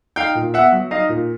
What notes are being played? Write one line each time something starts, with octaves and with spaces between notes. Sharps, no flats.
D#4 F5 G5
A#2
B3 E5 F#5
F#3
D#4 D#5 F5
A#2